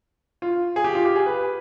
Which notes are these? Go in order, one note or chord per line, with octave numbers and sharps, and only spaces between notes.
F4
G#4
G4
F4
G4
G#4
B4